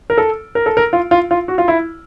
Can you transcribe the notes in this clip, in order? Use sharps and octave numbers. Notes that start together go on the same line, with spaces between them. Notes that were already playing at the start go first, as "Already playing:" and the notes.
A#4
A4
A#4
A4
A#4
F4
F4
F4
F#4
F4
E4